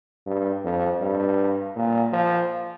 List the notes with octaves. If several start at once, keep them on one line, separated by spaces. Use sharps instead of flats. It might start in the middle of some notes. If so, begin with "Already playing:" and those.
G2
F2
G2
A#2
F3